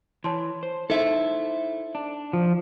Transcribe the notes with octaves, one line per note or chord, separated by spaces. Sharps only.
E3 C#5 A5 C6
C5
D#4 E4 A4 C5 E5
D4
F3